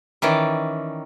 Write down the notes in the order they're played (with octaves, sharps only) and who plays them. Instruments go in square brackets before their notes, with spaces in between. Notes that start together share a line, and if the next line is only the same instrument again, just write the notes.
[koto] D#3 E3 C#4 D5